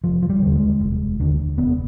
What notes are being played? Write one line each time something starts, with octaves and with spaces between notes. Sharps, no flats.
F1 F3
F3
G3
D#2 D3
G#3
F1
D#2 D3
F1 B3